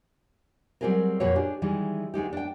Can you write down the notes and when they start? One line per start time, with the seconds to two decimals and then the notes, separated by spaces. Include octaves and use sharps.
0.81 F#3 G3 C4 F4 G#4 A#4
1.20 F2 A#2 A#3 F#4 B4 C#5
1.36 D4 G4 G#4
1.62 D#3 E3 G3 G#3
2.14 D2 G#3 D#4 G4
2.33 D4 G5